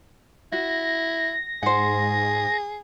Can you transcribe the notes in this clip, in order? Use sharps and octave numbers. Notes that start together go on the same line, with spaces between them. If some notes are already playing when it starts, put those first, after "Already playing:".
E4 F#4 A#6
G#2 G#4 C5 F#5